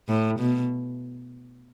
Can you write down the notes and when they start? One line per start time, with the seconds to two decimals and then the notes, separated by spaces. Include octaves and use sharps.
0.09 A2
0.39 B2